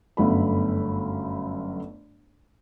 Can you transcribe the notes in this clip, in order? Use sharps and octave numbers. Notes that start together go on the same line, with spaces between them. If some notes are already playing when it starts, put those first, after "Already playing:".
G1 F#2 A3 B3 B5